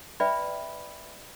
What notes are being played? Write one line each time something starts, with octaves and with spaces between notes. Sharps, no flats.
B4 D5 E5 G5 B5